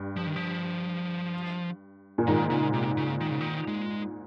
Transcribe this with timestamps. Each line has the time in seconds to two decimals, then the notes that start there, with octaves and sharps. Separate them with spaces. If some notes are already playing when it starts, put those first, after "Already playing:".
Already playing: G2
0.17 F3
0.27 D#3
0.36 F3
2.18 A#2
2.27 G#2 D#3
2.50 C#3
2.73 C3
2.97 C#3
3.21 D#3
3.31 C#3
3.41 D#3
3.68 G#3